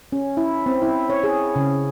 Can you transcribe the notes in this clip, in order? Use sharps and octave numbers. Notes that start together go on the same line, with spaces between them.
C#4
E4
C4
E4
C#5
G#4
C#3